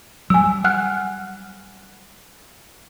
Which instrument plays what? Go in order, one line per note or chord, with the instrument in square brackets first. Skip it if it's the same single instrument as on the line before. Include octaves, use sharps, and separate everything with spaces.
[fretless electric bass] F#3 G3 [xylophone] G#5 E6
[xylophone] F#5 F6 F#6